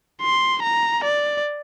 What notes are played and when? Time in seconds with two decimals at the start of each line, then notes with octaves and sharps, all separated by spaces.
0.22 C6
0.63 A#5
1.04 D5